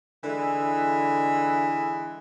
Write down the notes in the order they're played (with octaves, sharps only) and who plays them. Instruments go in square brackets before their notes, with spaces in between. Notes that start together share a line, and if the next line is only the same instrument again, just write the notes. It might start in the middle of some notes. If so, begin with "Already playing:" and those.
[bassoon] D3 [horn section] E3 G#3 E4